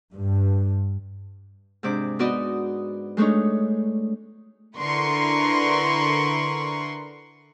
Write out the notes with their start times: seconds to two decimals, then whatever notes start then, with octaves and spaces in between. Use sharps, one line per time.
0.13 G2
1.83 G#2 C3 D4 D6
2.19 B3 D#4 F#4 B4 D5 D#5
3.17 G#3 A3 D4 D#4 C#5
4.79 D3 E4 A#4 B4 C6 C#6